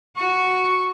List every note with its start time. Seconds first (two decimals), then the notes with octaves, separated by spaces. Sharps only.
0.17 F#4 C#6